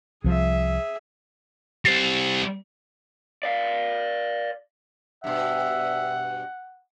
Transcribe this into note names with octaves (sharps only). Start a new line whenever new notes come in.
C2 F3 G#4 E5
G3 C4 A6 C7
D5 F5
G2 B2 E5 F#5